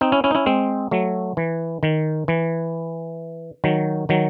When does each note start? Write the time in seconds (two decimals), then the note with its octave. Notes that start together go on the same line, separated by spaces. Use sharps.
0.01 C4 D#4
0.12 C#4 E4
0.24 C#4 E4
0.31 D#4
0.35 C#4 E4
0.46 G#3 C4
0.91 F#3 A3
1.37 E3
1.83 D#3
2.28 E3
3.64 D#3 F#3
4.09 D#3 F#3